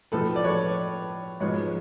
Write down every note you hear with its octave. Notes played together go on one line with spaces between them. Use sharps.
A2 F3 A4 B4
D5
B4 C#5
G#2 F3 B4 C#5